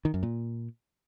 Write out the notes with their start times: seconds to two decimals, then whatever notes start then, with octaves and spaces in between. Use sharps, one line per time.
0.05 D#3
0.14 F#2
0.23 A#2